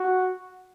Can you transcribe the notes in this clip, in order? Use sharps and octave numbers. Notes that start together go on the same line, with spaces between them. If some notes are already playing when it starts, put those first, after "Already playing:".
Already playing: F#4